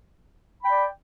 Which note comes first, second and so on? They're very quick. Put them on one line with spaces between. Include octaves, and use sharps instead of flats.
B5 G5 D5